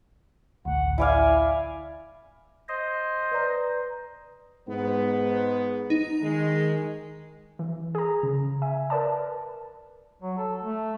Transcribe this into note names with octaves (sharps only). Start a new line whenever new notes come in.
A1 D2 F#5
E4 D5 F5 G#5
C5 D#5
B4 D5 A#5
G#2 B3
D#4
D#3 G#3
E3
G#4 A#5
C#3
E5 G#5
A#4 B4 D5 A5
F#3
A4
A3